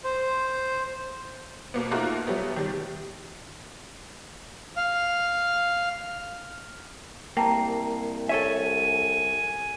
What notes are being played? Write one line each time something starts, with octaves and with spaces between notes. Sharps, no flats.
C5
B2 A#3 B3
A3 A#3 D#4 F4 F#4
F#3 G3 A3 B3
D#3 G3
F5
C2 A#3 G5 A5 A#5
A4 C#5 E5 G#5